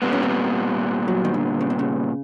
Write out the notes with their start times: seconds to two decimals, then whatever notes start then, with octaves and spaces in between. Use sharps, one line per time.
0.02 A#2 G3 B3 C4
0.13 C#4
0.23 C4
1.08 F#3
1.25 D#3
1.34 D3
1.61 C#3
1.70 C3
1.79 C#3